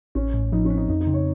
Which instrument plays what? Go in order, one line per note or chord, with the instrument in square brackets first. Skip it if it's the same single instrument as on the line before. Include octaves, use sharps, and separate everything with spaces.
[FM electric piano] A1 [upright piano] C#4
[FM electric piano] A2
[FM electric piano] F3 [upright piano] D#4
[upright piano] C#4
[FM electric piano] C4
[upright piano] D#4
[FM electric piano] F2 [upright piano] D#4
[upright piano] D#4
[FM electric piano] C#3
[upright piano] C#5